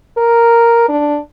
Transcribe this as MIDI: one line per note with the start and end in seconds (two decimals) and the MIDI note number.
0.18 0.87 70
0.89 1.19 62